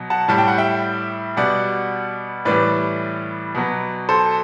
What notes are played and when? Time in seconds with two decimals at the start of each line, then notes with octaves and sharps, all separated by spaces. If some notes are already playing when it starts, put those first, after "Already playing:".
Already playing: B2 F#3
0.10 F#5 A5
0.28 A2 G3 A5
0.38 G5
0.48 F#5
0.58 E5 G5
1.37 B2 G3 D5 F#5
2.45 A2 E3 G3 B4 D5
3.55 B2 F#3
4.09 A4 C5